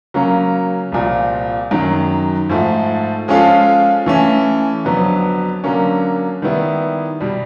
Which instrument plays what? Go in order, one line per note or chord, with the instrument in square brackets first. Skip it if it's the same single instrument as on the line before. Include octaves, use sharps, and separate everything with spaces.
[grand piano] C#3 F#3 A#3 C#4
C2 A#2 F3
F#2 D#3 F#3
G#2 F3 A3
F3 G#3 C#4 F4 A4
E3 A3 C#4
F2 D3 F#3 B3
D3 F#3 A#3 C#4
D#3 G3 B3 E4
B2 G3